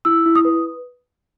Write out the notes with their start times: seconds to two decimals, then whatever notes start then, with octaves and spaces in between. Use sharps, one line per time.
0.05 E4 E6
0.26 E4
0.35 D#6
0.45 B4